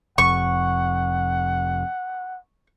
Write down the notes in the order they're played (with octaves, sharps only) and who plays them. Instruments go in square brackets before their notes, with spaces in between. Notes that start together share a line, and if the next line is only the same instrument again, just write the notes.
[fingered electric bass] F1 F2 [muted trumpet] F#5 [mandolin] C#6